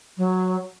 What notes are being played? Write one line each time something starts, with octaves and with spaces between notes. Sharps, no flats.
F#3